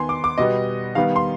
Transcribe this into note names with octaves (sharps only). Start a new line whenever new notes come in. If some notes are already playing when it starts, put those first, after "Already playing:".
Already playing: D#3 B3 G#5 C6
D6
D6
B2 G3 B3 D#5
D#3 G3 B3 F5
C6